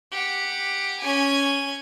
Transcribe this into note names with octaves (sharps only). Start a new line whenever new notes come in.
G4 F#5
C#4 G#5